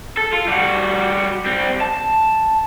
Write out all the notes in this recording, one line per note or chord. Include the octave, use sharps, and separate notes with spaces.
A4
F4
G3 F#4
G3 C4
A5